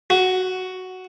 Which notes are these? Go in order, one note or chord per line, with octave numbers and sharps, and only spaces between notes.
F#4